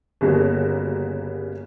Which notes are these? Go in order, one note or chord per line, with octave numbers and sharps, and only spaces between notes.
G1 C#3 G3 A#3 F#4